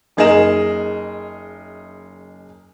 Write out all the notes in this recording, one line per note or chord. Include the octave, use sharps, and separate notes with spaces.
F#1 D#4 G#4 A#4 D#5 E7